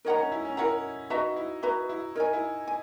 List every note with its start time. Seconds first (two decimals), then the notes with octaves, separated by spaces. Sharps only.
0.05 D#4 A#4 C#5 F#5 A#5
0.18 C#4
0.32 E4
0.45 C#4
0.57 E4 A#4 C#5 F#5 A#5
1.10 D#4 F#4 B4 E5 A#5
1.36 E4
1.62 F#4 B4 E5 A#5
1.89 E4
2.15 D#4 A#4 C#5 G#5
2.33 E4
2.67 G#5